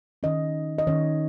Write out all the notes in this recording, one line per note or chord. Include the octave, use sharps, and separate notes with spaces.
D#3 C#4 D#5
D#5
D#3 C#4 C#5